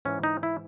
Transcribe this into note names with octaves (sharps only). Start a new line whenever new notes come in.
G#2 E3 C#4
D#4
E4